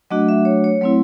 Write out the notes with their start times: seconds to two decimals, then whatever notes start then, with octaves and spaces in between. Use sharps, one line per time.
0.10 F#3 A3 D4 F#4 D#5
0.29 E5
0.45 C#5
0.64 C#5
0.81 F#3 A3 C4 E4